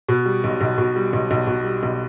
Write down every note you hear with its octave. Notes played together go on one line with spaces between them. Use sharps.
B2
G3
B1
B1
B2
G3
B1
B1
B2
G3
B1